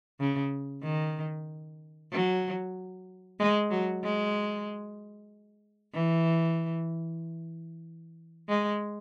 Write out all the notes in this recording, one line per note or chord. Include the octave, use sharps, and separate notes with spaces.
C#3
D#3
F#3
G#3
F#3
G#3
E3
G#3